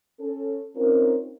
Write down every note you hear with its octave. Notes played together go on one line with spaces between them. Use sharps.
C#4 A4
C4 C#4 D#4 F4 A#4